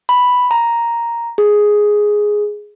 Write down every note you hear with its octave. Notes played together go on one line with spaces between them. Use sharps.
B5
A#5
G#4